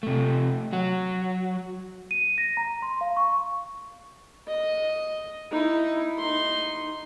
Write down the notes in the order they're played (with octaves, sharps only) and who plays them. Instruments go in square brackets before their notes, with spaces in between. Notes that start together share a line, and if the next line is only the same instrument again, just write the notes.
[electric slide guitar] C3 A3
F#3 F#4
[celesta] D#7
A#6
A#5
C6
F5
C#6
[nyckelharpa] D#5
D#4 E4
D#4 C6